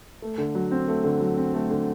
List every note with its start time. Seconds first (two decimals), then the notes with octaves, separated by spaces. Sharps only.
0.22 A3
0.38 D3
0.55 F#3
0.71 C4
0.88 A3
1.04 D3
1.20 F#3
1.37 C4
1.54 A3
1.70 D3